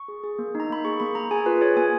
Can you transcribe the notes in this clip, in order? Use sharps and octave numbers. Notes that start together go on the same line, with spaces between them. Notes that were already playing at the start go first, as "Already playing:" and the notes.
Already playing: C#6
G#4
G#4
A#3
D#4 A#5
A#3 B5
G#4 C#6
A#3 B5
A#3 A#5
G#4 G#5
F4 B4
G#4 C#5
A#3 G#5